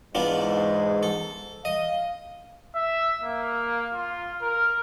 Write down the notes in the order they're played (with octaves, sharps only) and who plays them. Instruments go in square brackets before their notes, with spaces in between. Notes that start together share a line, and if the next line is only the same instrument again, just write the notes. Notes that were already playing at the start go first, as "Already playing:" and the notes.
[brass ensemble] E2 G#2 [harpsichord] B3 D4 F4
[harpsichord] A4
[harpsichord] D#5 [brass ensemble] F5
[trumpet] E5
A#3
F4
A#4